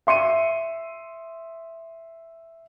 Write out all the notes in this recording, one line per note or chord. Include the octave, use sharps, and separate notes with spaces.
E5 C6 C#7 D#7